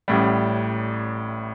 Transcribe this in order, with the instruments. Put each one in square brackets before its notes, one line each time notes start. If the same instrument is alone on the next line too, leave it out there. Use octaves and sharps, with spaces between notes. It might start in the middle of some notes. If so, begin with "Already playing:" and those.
[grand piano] A1 A2 G3